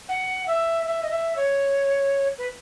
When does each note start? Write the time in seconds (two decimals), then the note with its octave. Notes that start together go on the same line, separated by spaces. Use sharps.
0.09 F#5
0.47 E5
0.86 E5
1.03 D#5
1.10 E5
1.36 C#5
2.38 B4